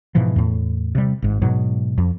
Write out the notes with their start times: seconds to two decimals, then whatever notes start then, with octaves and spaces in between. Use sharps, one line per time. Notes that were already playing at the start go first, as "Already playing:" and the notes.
0.15 G#2 B2 E3 F3
0.36 E2 A2
0.95 C3 G3
1.22 G#1 G#2
1.42 G#2 B2 F#3
1.98 F2